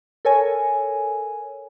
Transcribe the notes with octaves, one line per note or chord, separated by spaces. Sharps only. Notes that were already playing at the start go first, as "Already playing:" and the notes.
A4 A#4 C#5 G#5